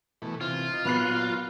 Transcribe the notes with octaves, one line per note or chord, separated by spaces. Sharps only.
B2 E3 A3
C3 E3 F4
D#4
A#2 F#3 B3 F#6 C7